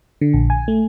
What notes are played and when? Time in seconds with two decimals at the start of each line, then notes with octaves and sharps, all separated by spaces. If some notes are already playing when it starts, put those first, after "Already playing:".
0.21 D3
0.34 A#1
0.50 G#5
0.68 A3